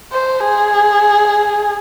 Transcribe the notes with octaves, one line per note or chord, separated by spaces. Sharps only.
C5
G#4